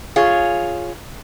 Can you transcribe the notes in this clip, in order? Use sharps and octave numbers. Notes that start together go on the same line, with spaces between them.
F4 G#4 C#5